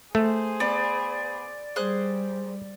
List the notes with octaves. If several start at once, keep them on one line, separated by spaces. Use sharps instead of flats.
A3 G#4 C5
B3 B4 D5
G3 G#4 C5 F#6